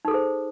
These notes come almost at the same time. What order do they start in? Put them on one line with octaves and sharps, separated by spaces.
D#4 A4 G#4 C5